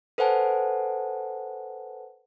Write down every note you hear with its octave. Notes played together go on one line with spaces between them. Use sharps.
A4 B4 C5 F#5 G#5 A5